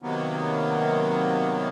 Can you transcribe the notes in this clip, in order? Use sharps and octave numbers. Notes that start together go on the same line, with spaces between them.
C3 D#3 F#3 A#3 B3